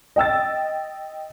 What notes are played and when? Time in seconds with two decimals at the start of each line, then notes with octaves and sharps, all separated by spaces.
0.16 D#5 G5 E6 A6